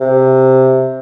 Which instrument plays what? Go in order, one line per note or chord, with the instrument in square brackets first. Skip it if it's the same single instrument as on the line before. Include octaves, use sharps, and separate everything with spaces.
[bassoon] C3